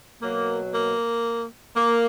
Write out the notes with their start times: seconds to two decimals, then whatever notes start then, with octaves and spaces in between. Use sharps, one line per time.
0.22 B2 F#3 A#3
0.73 A#3
1.76 A#3